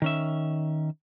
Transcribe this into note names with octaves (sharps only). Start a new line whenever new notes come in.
D#3 C#4 E5